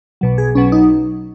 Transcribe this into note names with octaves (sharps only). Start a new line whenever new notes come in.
B1 B2 F#3
G#4
B1 B2 F#3 C#4
D#4